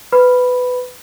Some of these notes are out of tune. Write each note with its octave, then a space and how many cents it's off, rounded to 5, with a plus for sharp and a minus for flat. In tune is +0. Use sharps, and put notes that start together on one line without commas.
B4 +15 B5 +0